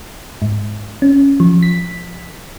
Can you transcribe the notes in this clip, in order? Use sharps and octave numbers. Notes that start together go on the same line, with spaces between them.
G#2
C#4
F3
B6